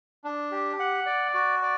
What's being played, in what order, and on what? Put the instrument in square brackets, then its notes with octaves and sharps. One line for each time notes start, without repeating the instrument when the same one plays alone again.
[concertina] D4
G4
F#5
D5
F#4
D5